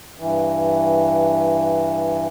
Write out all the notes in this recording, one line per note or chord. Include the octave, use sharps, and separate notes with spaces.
G2 E3